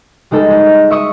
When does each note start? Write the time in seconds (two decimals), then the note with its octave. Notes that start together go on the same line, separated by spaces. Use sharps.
0.31 G3 G#3 D#4 A4
0.50 G#3
0.90 E5 C#6 D#6